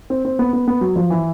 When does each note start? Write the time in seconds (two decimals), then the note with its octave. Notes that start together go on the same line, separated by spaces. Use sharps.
0.10 C4
0.25 C4
0.39 B3
0.53 B3
0.68 B3
0.81 F#3
0.96 F3
1.10 E3